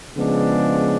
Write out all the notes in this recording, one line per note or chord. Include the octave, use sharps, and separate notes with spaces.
C#3 F3 G#3 B3 D4